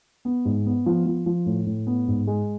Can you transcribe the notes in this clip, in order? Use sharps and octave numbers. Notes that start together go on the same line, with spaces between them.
B3
G#2
B3
F3
F3
F3
A2
A2
B3
G#2
G#3